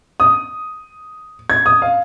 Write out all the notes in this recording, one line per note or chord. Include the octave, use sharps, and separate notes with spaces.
D#6
G#6
D#6
F5